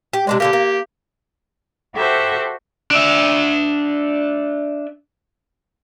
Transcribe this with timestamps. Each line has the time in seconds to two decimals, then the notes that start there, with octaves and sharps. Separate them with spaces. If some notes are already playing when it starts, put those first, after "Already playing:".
0.13 G4
0.27 C3 G#3 D4 D5
0.40 D3 G3 A#3 G4
0.53 A#3
1.95 F#4 G4 A4 C5 E5 F#5
2.91 D4 E5